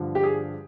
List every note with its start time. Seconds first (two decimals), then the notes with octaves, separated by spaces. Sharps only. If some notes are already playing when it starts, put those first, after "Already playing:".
Already playing: G2 D3 F3
0.15 G4
0.24 G#4